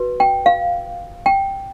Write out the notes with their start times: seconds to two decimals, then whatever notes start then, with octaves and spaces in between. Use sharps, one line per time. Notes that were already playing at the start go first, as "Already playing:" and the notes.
Already playing: F#4 B4
0.20 G5
0.46 F5
1.26 G5